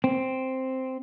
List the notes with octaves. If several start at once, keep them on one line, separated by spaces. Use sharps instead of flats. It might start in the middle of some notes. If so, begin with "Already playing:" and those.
C4